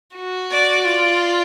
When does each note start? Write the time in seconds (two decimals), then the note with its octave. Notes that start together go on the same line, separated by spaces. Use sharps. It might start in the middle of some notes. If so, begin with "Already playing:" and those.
0.16 F#4
0.50 D5
0.85 F4 D5